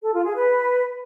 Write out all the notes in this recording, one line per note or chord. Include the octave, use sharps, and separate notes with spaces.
A4
F4
G#4
B4